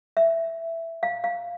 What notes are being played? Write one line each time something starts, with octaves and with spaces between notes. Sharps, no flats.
E5
F5
F5